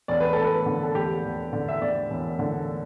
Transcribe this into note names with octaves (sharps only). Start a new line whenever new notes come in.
E1 D5
B4
E1 A4
B4
D3
A4
E1 G4
E1
D3
E5
D3 D5
E1
D3